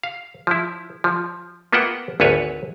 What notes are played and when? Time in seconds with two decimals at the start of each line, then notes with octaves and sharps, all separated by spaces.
0.03 F5
0.47 F3 E4
1.04 F3
1.73 A#3 B3 F4 E5 F#5 G5
2.20 G#1 D2 A4 B4 C#5 G#5